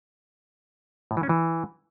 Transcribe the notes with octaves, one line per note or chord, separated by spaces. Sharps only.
A2
E3
C#4
E3